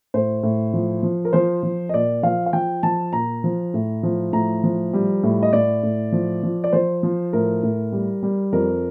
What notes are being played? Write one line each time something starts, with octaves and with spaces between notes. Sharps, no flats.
A2 C5
A2
F3
F3
A#4
F3 C5
F3
D#5
A#2 D5
F3 F5
F5
F3 G5
F3 A5
A#2 A#5
F3
A2
F3
A2 A#5
F3
G3
A2
D#5
A2 D5
A2
F3
F3
D5
F3 C5
F3
A2 A#4
A2
G3
G3
F2 A#4